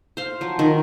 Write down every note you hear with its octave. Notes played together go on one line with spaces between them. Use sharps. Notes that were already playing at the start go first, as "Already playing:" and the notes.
C5 F5
F3 F#3
D#3